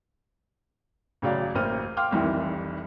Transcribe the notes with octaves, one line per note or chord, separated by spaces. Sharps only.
A1 C#3 F#3 D5 F5
A1 A#3 C5 F6 D#7
F5 G5 C6 D6 F6
F1 C2 D#3 E3